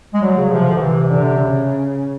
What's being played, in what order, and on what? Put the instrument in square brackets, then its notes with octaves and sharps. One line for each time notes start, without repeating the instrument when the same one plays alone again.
[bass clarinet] G#3
[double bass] F#3 [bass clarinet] G3
[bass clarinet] C#3
[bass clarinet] C3 [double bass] F3
[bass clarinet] D3
[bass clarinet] C3 [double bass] E3
[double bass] D3
C#3